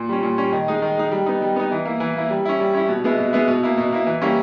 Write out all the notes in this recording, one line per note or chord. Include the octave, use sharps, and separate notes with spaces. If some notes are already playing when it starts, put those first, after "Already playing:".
Already playing: A#2
G3 C#4
A#2
G3 C#4
D#3
G#3 D#4
D#3
G#3 D#4
G3
B3 D#4
G3
B3 D#4
E3
A#3 E4
E3
A#3 E4
G3
C#4 E4
G3
C#4 E4
B2
G#3 B3 E4
B2
G#3 B3 E4
B2
A#3 E4
B2
A#3 E4
E3
G3 A#3 C#4 E4